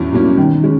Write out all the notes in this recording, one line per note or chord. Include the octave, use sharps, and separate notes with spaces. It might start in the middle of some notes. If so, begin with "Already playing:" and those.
Already playing: E2 B2 C#4
B2 F#3 A#3 C#4
D#3
G#3 C#4